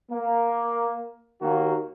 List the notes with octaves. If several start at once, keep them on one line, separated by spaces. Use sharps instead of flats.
A#3
D#2 D#3 A#3 F#4